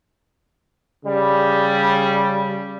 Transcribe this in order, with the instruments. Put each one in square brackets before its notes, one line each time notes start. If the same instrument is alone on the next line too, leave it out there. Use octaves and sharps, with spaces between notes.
[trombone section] C#3 G3